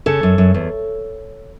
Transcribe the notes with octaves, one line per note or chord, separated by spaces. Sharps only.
C#3 A4 C#5
F#2
F#2
E2